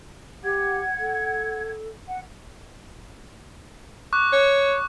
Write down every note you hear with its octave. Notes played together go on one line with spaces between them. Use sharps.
G4 F#5 G#6
A4
F#5
C#6 D6 F#6
C#5